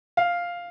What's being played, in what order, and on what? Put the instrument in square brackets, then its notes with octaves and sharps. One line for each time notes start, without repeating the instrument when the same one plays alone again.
[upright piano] F5